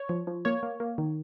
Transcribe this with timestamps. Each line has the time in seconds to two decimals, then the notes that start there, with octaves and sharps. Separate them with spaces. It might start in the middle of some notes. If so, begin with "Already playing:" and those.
Already playing: C#5
0.09 F3
0.27 F3
0.45 A#3 C#5
0.63 A#3
0.80 A#3
0.98 D#3